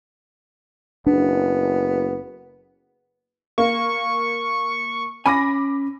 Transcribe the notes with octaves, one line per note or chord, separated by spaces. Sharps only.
F#1 B3 D4
A#3 C#6
C#4 G#5 B5 D6 A#6